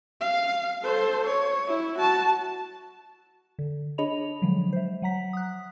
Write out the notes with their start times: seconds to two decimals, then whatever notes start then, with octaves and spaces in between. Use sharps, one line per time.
0.21 F5
0.83 A4 C5
1.27 C#5
1.68 E4
1.99 F#4 A5
3.59 D3
3.98 D4 G#4 C#5 D#5 B5 F7
4.42 D3 F3 F#3 G#3
4.73 C5 E5
5.02 F#3 F#5 A#5 B6
5.33 D#6 F#6